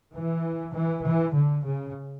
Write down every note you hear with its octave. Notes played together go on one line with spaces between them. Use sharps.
E3
E3
E3
D3
C#3